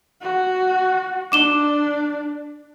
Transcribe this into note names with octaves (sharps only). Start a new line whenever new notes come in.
F#4
D4 D6 E7 G7